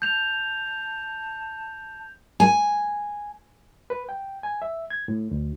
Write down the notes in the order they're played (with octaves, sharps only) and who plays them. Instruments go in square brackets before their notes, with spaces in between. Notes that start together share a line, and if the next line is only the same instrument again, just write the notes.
[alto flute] A5 [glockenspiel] G6 F7
[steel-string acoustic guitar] G#5
[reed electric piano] B4
G5
G#5
E5
G#6
A2
D2